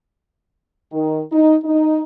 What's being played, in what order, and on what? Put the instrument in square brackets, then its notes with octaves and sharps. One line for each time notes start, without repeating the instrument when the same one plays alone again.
[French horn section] D#3
D#4
D#4